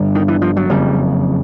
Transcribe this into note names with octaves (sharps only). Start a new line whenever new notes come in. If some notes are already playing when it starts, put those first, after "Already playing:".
Already playing: G1 G2 D3
D#3
E3
F3
F#3
F#1 F2 C#3 G3